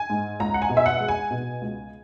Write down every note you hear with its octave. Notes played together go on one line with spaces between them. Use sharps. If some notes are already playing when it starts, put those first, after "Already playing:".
Already playing: G#5
G#2
C#2 A#5
F#5
G#5
B2
E5
F#5
G#3
G#5
B2
C#2